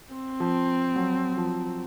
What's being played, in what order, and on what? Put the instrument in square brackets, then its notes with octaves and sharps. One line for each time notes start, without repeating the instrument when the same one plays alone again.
[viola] C4
[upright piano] F3
F#3
F3